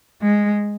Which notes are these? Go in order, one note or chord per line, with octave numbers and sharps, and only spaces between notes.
G#3